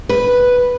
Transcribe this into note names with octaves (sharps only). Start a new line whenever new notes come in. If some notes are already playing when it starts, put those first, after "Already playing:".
B4